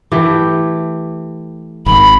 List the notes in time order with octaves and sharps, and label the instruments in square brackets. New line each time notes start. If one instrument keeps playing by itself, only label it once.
[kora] E3 A3 G4
[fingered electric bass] G#1 [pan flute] B5